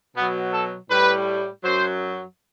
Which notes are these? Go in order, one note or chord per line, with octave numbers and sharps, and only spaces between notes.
B2 F#3 B3
A4
A2 G3 B4
F#2 F#3 C5